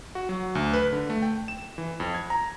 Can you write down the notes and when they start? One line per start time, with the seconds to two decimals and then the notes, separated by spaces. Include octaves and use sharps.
0.15 F#4
0.29 F#3
0.55 D2
0.74 B4
0.92 D3
1.10 A3
1.22 G5
1.48 E7
1.78 E3
2.00 F2
2.14 G#6
2.30 A#5